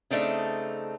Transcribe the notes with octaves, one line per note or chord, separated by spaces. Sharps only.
C#3 A3 C4 D4 D#4